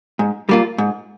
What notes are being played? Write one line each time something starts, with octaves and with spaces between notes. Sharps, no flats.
G#2
G3 A#3 F4
G#2